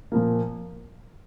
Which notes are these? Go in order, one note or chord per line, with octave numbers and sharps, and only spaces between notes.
A#2 F3 A#3